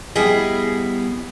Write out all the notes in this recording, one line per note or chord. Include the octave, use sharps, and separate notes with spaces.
G3 B3 E4 G#4 D#5